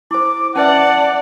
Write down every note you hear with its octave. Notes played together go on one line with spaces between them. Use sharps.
E4 C5 D6
C#4 B4 D5 E5 F#5 A5